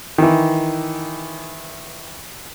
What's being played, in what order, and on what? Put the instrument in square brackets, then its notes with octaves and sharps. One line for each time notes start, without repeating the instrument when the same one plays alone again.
[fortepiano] D#3 E3